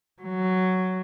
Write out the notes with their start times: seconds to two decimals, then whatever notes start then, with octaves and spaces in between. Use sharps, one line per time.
0.22 F#3